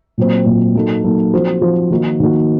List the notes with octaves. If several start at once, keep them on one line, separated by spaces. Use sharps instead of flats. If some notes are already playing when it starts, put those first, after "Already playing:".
A#2 F#3 C4
A#2 F#3 C4
F#3 A#3 D#4 A4
F#3 A#3 D#4 A4
F3 C4 F#4 C5
F3 C4 F#4 C5
D#3 A#3 D#4 F#4
D#3 A#3 D#4 F#4